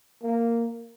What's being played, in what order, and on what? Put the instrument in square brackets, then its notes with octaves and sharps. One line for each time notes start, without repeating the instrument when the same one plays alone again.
[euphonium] A#3